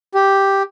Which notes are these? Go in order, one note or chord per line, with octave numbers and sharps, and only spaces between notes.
G4